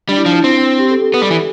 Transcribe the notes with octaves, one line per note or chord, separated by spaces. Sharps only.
G3 D4
E4
F3 D4
E4
C4
G4
A4
A4
B3
G3
E3